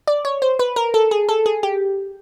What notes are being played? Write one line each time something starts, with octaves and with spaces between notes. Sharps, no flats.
D5
C#5
C5
B4
A#4
A4
G#4
A4
G#4
G4